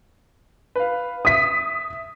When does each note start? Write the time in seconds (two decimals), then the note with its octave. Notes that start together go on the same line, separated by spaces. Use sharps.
0.75 B4 F5
1.25 E5 D#6 B6